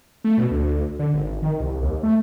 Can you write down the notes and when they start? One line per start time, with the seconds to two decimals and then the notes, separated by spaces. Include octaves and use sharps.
0.24 A3
0.38 B2
0.51 D2
0.99 D3
1.14 G#1
1.42 D#3
1.60 C2
1.83 D#2
2.03 A3